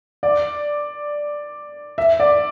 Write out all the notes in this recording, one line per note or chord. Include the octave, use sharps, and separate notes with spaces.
D5
E5
D5